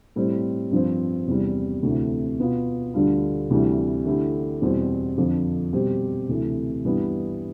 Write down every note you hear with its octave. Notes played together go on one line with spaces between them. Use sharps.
A2 G3 C4
G2 F3 C4
E2 C3 G3
D2 C3 E3 A3
B2 B3 F4
D2 D3 G3 D4 F4
D2 C3 E3 G3
D3 A3 E4 G4
E2 B2 G3 C4
F2 D3 F3
B2 G3 C4 G4
D2 C3 E3 A3
G2 E3 G3 B3